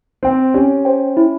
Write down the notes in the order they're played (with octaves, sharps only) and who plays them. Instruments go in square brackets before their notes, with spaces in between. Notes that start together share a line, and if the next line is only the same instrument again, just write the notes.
[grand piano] C4 [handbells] C5 G5
[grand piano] C#4 [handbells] G4
[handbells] C5 G5
E4